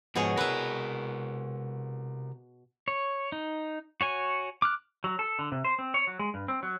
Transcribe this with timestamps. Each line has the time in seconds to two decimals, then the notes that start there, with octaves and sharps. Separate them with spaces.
0.15 G#2 B2 F3 G#4 C#5
0.37 C3 A#4 B4 E5
2.88 C#5
3.32 D#4
4.01 F#4 C#5 G#5
4.62 D6 F6 F#6
5.04 F#3
5.19 A4
5.39 D3
5.52 C3
5.64 C5
5.79 C4
5.94 C#5
6.07 F#3
6.19 G#3
6.34 G2
6.48 C4
6.63 F#3